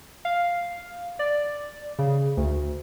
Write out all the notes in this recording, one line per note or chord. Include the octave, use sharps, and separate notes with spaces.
F5
D5
C#3
D2